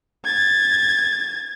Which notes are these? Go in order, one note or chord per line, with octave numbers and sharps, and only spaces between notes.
G#6 A6